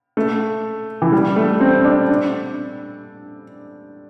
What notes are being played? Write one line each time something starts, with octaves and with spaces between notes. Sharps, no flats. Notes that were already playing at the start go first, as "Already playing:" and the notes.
A3
E3
G3
A3
C4
D4
D4